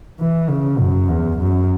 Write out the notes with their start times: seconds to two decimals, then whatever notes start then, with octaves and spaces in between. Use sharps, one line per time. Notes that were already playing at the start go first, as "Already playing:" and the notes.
0.20 E3
0.50 C#3
0.79 F#2
1.09 E2
1.39 F#2